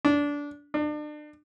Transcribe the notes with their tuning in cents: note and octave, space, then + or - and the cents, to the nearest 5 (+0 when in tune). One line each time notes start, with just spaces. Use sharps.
D4 -20
D4 +35